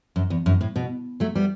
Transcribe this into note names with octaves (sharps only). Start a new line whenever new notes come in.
F#2
E2
F#2
A2
B2
F#3 A3
G3 B3